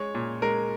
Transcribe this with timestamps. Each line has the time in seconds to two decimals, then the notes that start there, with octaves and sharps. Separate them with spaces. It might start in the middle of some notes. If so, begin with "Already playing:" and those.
Already playing: G#3 C#5
0.15 A#2
0.42 G#3 A#4